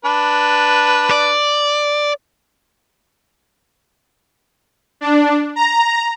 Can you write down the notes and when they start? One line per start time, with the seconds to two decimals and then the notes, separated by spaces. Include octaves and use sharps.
0.05 D4 B4
1.11 D5
5.01 D4
5.56 A#5